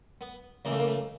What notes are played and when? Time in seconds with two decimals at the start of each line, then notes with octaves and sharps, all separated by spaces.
0.21 B3
0.65 C#2 C#3 E3 A#3
0.72 A3
0.79 A#3
0.87 A3